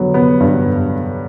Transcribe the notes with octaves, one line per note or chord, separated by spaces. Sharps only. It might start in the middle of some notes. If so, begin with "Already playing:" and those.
Already playing: D3 F#3 B3
B3
G2